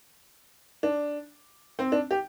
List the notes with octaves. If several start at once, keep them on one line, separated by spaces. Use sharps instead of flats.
D4
C4
D4
G4